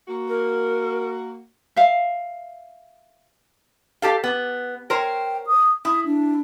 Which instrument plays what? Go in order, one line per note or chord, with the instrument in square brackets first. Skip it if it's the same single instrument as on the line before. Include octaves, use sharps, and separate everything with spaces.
[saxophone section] A#3 F#4
[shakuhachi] A#4
[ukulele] E5 F5
[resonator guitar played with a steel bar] G4 A4 F5
B3
[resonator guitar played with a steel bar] A#4 C5 C#5 [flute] G5
[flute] D#6
[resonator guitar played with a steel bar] E4 [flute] D#6
[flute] D4